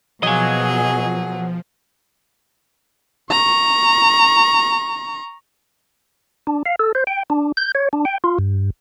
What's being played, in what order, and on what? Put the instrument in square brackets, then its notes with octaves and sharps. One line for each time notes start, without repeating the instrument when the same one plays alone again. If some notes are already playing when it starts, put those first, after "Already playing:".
[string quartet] B2 G#4 [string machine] F3 [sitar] F#3 A#3 [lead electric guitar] D#5 G#5
[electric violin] A#5 C#6
[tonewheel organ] D4
F5
A4
C5
G5
D4
G6
C#5
D4
G5
F4
G2